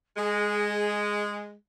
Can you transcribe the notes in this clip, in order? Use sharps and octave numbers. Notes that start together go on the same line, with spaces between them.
G#3 G#4